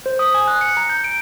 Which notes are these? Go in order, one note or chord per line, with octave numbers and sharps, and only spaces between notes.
C5
D#6
G#5
F#6
C#7
A#5
G6
D7